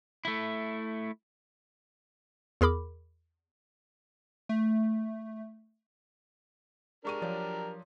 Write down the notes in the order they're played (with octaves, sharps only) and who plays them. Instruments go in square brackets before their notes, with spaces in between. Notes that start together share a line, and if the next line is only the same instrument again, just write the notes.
[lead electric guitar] A3 E4
[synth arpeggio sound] E2 G#4 A#4 B5 D6
[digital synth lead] A3
[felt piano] G#3 C#6 D#7 [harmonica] D4 G4 A#4
[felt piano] F3 F#3 D5